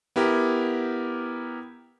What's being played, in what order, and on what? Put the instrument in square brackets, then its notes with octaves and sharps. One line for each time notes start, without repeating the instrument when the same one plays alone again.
[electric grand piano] B3 E4 G4 A#4